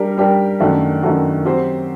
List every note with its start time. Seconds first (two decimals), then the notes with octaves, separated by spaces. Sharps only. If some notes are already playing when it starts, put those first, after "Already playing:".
Already playing: G3 D4 G4 A#4
0.18 G3 D4 G4 A#4
0.60 F#2 D#3 A3 D4 F#4
1.03 F#2 D#3 A3 D4 F#4
1.45 F#3 C4 G4 C5